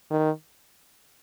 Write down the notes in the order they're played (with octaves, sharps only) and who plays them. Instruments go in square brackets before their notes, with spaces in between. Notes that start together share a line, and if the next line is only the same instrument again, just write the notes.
[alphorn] D#3